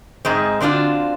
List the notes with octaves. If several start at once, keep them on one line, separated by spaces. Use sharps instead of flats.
G#2 G#3 C4
D3 C4 D4 F4 F#4